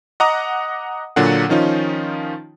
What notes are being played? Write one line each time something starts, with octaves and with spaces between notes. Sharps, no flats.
D#5 F#5 A#5 D6 D#6
A#2 D3 F#3 D4 F#4 F#5
D#3 F3 C#4 D#4 F4